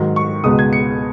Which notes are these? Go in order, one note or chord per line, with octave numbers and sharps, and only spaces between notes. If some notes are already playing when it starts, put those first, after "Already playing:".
Already playing: G#2 D#3 F#3
C#6
C#2 B2 G#3 B3 D#6
G#6
C#7